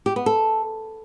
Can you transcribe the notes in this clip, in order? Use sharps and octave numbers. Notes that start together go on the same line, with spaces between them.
G4
B3
A4